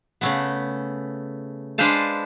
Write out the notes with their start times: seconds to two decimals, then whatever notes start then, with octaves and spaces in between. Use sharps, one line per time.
0.21 C#3 A3 B3
1.78 G#3 D4 B4 C5 F5 A5